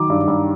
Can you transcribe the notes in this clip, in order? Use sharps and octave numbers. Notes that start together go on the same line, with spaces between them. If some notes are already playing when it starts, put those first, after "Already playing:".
Already playing: D#3 F#3 D6
G2
G2